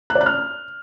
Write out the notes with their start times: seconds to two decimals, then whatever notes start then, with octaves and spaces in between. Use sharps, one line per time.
0.10 F#6
0.15 D5
0.21 F#6
0.26 F6